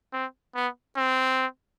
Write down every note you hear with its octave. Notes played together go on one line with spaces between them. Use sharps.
C4
B3
C4